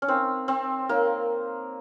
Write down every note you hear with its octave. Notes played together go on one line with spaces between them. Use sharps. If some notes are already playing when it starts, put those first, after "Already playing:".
C#4
C4 D#4 A#4 C#5 F5 A#5
C4
A#3 D#4 A#4 C#5 F5 A#5